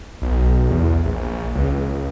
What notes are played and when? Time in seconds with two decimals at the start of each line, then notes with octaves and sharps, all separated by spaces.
0.22 B1
0.71 E2
1.06 A#1
1.55 C#2